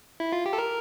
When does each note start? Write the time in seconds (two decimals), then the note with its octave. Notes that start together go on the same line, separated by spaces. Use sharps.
0.20 E4
0.33 F4
0.46 G4
0.53 A4
0.58 A#4